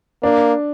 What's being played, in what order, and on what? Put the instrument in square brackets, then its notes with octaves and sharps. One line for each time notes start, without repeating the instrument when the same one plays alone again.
[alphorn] A#3 [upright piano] D4